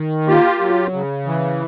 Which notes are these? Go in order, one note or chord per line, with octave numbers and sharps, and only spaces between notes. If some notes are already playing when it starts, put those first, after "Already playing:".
Already playing: D#3
A#3 F4 G4
F#3
C#3
E3